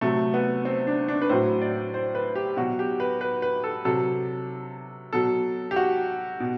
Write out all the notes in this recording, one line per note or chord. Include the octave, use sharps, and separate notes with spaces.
C3 F#3 A3
B3
C4
D4
D4
B4
A2 F#3 C5
D5
C5
B4
G4
B2 F#3 F#4
G4
B4
B4
B4
A4
C3 F#3 A4
B2 F#3 A4
G4
F#4
B2